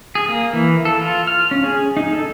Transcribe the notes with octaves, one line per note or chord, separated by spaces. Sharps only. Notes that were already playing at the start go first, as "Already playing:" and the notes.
G#4
A#3
E3
A4
F4
F6
C#4
G#4
D#4
A4